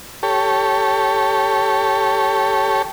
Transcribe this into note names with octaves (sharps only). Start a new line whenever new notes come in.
G4 A4 C#5